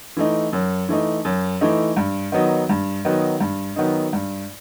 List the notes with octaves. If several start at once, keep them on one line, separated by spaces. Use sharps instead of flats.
E3 A3 D#4
F#2
E3 A3 D#4
F#2
E3 A3 D#4
G2
D#3 F#3 B3 D#4
G2
D#3 F#3 B3 D#4
G2
D#3 F#3 B3 D#4
G2